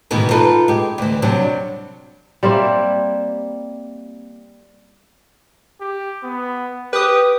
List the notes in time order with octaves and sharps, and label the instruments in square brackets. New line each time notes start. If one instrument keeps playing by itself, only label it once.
[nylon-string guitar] G#2 B2 D#3 E3
D#4 F4 A4 B4
G#3 G4
D2 E3
C3 F#3 G3 D4
[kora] G3 A#3 C4 E4
[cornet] G4
B3
[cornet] G4 [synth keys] B4 D#6